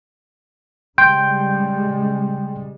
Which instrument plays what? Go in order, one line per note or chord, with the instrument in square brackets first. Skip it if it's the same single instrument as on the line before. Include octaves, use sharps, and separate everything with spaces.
[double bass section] C#3 G3 G#3 [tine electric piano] G5 C6 G6